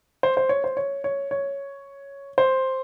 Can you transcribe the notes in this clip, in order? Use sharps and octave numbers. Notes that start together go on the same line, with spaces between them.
C5
C5
C#5
C5
C#5
C#5
C#5
C5